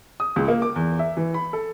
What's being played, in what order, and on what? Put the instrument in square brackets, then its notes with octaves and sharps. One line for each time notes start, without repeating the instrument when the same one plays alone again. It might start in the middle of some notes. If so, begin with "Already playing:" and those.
[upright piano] D#6
C#2
A#3
D6
E2
E5
E3
B5
A4